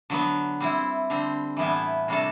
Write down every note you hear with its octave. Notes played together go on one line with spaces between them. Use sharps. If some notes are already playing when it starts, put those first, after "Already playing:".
D3 F#3 B3
G3 C4 E4
D3 G3 C4
A2 E3 G3 B3 E4
C3 G3 D4 F#4 A4